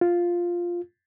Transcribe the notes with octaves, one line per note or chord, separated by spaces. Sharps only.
F4